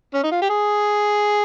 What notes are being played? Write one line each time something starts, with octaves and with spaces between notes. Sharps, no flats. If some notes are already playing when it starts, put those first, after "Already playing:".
C#4
D#4
F4
G4
G#4